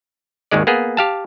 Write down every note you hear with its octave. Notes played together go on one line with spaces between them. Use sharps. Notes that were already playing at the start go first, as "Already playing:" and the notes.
G#1 D#2 D#3 G#3 D5
A#3 B3 G#4
G4 F5 A5